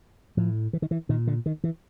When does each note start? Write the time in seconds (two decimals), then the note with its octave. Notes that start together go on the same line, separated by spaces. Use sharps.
0.37 A2 F3
0.73 E3
0.82 D#3
0.91 E3
1.09 A#2 D#3
1.27 D3
1.46 D#3
1.64 E3